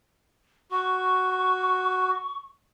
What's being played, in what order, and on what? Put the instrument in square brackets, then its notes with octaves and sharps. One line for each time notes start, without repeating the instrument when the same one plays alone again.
[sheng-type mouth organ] F#4 [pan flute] C#6